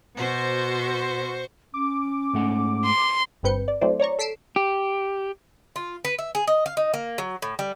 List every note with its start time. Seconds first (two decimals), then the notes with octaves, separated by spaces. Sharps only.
0.16 B2 F#4 C5 C#6
1.74 C#4 D6
2.33 G#2 A3 F#5
2.85 C6
3.43 G1 G2 C4 B4 G6 C#7
3.68 D5
3.81 F#3 A3 C4 E4 C5 D5
4.00 C#5 D5 A#5 C#6
4.19 A4 B6 C7 D7 E7
4.56 G4
5.76 F4
6.05 B4
6.19 E5
6.35 G#4
6.47 D#5
6.66 F5
6.77 D#4
6.94 A#3
7.18 F#3
7.42 A2
7.59 G3